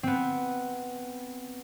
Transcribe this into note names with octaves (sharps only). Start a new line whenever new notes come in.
B3 C4